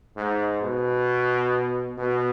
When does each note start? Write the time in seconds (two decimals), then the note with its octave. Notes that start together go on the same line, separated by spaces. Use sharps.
0.17 G#2
0.62 B2
1.98 B2